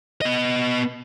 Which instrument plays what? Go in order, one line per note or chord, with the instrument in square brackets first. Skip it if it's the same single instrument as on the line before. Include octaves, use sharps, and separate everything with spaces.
[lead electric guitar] B3 D#5